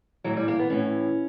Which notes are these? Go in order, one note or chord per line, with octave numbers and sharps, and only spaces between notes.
A2 E3 F#3
G3
A#3
B3
A2 E3 C#4